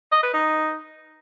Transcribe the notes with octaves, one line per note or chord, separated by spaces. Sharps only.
D#5
B4
D#4